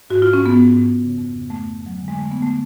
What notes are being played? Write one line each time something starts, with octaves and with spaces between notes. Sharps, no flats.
G#2 F#4
F4
G#2
C#4
G#2 B3
G#2
G#2
G#2
C#3
F2
C#3
F2 A3
F2
F2
F#3
D3 G#3
G#3
D3
A3
D3
B3
D3 A3